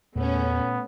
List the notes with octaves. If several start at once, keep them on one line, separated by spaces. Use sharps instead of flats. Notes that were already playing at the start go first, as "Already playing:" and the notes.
E2 A#2 A3 B3 C#4